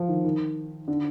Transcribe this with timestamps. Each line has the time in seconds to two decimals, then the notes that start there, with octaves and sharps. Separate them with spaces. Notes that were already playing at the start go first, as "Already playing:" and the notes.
Already playing: F3
0.09 D#3
0.24 D#3
0.88 D3